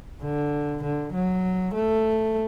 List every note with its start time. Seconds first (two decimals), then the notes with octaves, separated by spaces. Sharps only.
0.23 D3
0.83 D3
1.13 F#3
1.74 A3